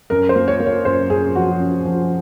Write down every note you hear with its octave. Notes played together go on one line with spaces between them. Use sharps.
F#2 A#4
C5
A#3
C#5
A#3
C#5
F#2 C5
F#2 G#4
F3 F#4
C#4
F3